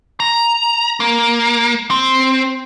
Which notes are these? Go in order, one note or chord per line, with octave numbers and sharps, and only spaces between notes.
A#5
A#3
C4